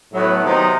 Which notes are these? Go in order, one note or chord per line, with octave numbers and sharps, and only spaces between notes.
A2 F#3 B3
C3 D#3 F#3 B3 D#4